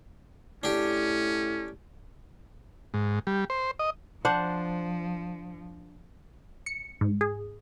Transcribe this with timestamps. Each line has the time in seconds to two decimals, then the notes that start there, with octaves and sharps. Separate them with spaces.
0.63 A2 C#4 D4 G4
2.94 G#2
3.27 G3
3.50 C5
3.79 D#5
4.25 F3 D4 C5 F#5
6.66 C#7
7.01 G#2
7.21 G#4